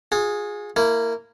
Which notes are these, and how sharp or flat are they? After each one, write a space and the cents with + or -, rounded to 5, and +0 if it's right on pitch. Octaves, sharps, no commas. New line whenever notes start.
F4 +45 G#4 +0
A#3 -15 E4 +0